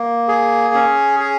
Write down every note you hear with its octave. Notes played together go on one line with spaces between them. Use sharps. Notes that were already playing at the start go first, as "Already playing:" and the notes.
Already playing: A#3
G#4
C#4
G#4